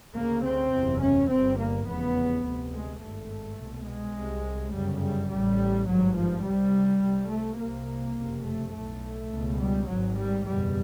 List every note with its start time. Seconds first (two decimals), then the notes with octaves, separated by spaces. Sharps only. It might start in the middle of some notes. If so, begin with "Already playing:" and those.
0.15 D2 C#3 A#3
0.44 C4
0.73 F#1 E2 C3
1.02 C#4
1.30 G1 G2 C4
1.58 A#3
1.88 F1 E2 C#3 B3
2.44 D2 C3
2.74 G#3
3.01 G#1 G2 A3
3.60 C2 B2
3.87 G#3
4.17 C2 C3
4.74 G1 F#2 C#3 G3
5.02 G3
5.31 A1 A2 G3
5.89 G#1 G2 F#3
6.17 F3
6.45 C2 C3 G3
7.04 C2 C3
7.32 A3
7.60 C2 C3 A#3
8.18 F#1 F2 C3
8.46 A3
8.74 B1 A2 A3
9.31 C#2 B2
9.61 G3
9.89 G#1 G#2 F#3
10.18 G3
10.46 F#1 E2 B2 G3